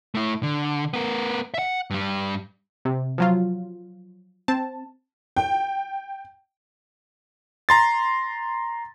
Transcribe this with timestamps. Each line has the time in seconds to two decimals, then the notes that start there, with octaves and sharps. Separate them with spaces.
0.15 A3 E4
0.43 D3
0.94 B3 A#4
1.54 E5 F#5
1.90 G2 G3
2.85 C3
3.18 F3 F#3 F4
4.48 C4 A5
5.37 G5
7.69 A#5 C6 A6